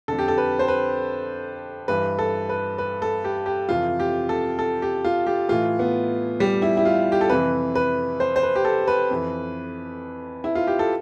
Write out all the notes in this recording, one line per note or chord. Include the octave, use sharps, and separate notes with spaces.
F2 D3 A4
G4
A4
B4
C5
B4
G2 E3 B4
A4
B4
B4
A4
G4
G4
F2 C3 E3 F4
G4
A4
A4
G4
F4
G4
A2 E3 F4
B3
G3
E4
E4
F4
G4
A4
F2 C3 E3 B4
B4
C5
C5
B4
G4
A4
B4
F2 E3
E4
F4
G4
A4